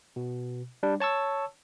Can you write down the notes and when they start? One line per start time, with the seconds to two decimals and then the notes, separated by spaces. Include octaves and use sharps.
0.16 B2
0.83 G3 D4
1.00 C#5 A5 C#6 E6